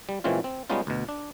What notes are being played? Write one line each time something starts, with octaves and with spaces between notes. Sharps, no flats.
G3
A#2 E3 G#3 C4 C#4 F4
C4
G3 G#3 B3 C#4 D#4 F4
D2 B2
D4